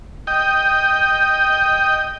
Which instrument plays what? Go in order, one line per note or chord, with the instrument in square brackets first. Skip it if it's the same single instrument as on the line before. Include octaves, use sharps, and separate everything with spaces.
[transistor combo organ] D#5 G5